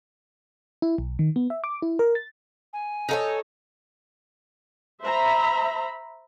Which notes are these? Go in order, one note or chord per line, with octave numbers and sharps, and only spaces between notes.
E4
B1
D#3
B3
E5
D6
E4
A#4
A6
G#5
D#4 A4 C#5
C5 E5 A#5 B5